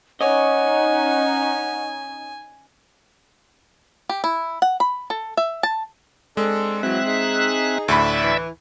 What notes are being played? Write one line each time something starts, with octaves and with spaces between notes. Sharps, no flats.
C#4 D#4 C#5 D#5 F#5 G#5
G4
E4
F#5
B5
A4
E5
A5
G#3 C4 D4 A4
E3 F#3 C4 E5 F#6
D#4 G#4
D2 A2 D5 E5 B5 E6
E3